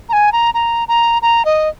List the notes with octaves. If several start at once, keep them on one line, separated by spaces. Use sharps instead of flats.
A#5
G#5
A#5
A#5
A#5
A#5
D#5